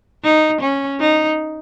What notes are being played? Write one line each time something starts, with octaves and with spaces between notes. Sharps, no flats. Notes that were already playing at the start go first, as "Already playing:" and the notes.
D#4
C#4
D#4